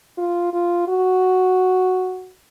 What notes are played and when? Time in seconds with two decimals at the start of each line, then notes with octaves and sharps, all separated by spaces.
0.18 F4
0.53 F4
0.88 F#4